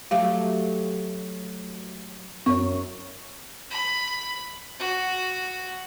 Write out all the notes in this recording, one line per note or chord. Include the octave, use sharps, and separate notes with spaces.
F#3 A3 G4 F5
F#2 C#5 C#6
B5
F#4